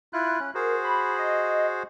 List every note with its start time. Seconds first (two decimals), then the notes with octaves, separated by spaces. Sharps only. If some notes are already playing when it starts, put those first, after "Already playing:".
0.13 E4 F4 F#6
0.40 C#4
0.55 F#4 G#4 A#4 C5
0.84 B5
1.18 D#5